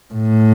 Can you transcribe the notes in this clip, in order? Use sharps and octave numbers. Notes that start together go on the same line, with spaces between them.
A2